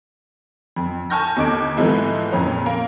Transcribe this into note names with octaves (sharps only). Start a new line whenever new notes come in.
F2
G#5 A5 C#6 F6 G6 A#6
D#2 D3 D#4 D6 G#6 D7
G#2 E3 F3 G#3 A3 E4
F2 A#2 C#4
A#3